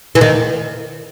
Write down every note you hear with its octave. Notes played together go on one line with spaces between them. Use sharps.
E3
D#3